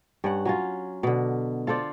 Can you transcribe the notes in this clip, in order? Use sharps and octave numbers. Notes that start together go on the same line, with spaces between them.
G2 C#4 F#5
F#3 C#4 F4
B2 D3
F4 A4 C5 D5